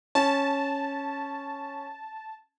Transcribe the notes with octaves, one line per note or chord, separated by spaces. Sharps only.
C#4 A5